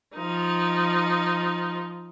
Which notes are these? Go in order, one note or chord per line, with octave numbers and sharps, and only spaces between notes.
F3 D#4